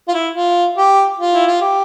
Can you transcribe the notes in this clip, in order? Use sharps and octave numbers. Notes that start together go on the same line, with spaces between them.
F4
E4
F4
G4
F4
E4
F4
G4